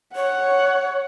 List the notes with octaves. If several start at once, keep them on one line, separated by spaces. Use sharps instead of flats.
C#5 F#5